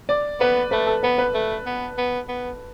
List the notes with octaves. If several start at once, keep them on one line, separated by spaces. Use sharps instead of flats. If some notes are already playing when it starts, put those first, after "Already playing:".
D5
B3 B4
A3 B4
A4
B3 B4
B4
A3
B3
B3
B3